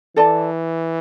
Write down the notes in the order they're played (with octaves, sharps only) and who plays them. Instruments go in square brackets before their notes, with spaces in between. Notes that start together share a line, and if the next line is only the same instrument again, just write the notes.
[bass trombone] E3 [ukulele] A4 D5 A5